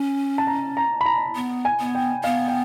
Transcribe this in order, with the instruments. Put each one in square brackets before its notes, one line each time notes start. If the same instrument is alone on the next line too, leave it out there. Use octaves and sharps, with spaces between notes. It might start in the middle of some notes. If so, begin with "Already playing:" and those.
Already playing: [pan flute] C#4
[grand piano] A5
A#5
A#5
B5
A#5
[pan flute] B3
[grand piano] G#5
[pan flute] B3
[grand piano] G5
[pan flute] B3 [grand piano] F5
[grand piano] G5